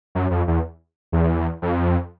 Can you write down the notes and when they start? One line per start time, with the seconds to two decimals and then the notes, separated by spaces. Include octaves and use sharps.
0.15 F#2
0.31 F2
0.48 E2
1.12 E2
1.62 F2